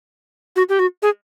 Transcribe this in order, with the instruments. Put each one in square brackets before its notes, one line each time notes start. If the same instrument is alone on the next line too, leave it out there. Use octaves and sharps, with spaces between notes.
[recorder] F#4
G4
F#4
G#4